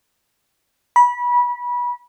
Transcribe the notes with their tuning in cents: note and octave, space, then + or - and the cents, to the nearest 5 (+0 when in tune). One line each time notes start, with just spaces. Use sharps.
B5 -25